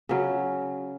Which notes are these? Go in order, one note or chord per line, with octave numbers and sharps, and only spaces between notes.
C#3 F#3 C#4